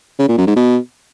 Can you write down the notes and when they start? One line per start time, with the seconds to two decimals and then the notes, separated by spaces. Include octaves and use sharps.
0.19 C#3
0.28 A#2
0.38 F#2
0.47 G#2
0.56 B2